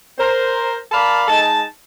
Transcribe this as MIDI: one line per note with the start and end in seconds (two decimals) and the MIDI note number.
0.18 0.75 70
0.18 0.75 72
0.92 1.23 70
0.92 1.23 74
0.92 1.23 77
0.92 1.23 81
0.92 1.23 83
1.28 1.63 56
1.28 1.63 63
1.28 1.63 81